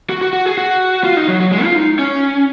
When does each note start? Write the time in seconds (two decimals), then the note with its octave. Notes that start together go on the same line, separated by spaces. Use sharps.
0.10 F#4
0.21 F#4
0.33 F#4
0.46 G#4
0.57 F#4
1.04 F4
1.17 D#4
1.29 F#3
1.40 F#3
1.51 G#3
1.64 F4
1.75 D#4
1.99 C#4